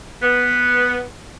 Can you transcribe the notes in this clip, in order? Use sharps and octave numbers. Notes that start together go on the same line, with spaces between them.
B3